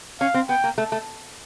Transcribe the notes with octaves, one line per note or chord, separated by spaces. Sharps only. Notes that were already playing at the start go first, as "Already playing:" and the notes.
C#4 F5
C4
B3 G5
A#3
A3
A3